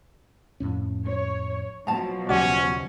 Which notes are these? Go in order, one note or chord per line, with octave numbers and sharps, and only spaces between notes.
F2 A2 C#4
C#5
B2 F3 F#3 C#5 A5 A#5
D#2 C#3 G3 C#4 F#4 D5